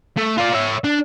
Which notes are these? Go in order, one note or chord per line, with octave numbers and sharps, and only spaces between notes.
A3
F4 D5
C#5 E5
D4